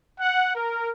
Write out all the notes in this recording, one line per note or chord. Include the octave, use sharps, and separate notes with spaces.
F#5
A#4